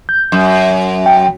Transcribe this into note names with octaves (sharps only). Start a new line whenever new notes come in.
G6
F#2
G5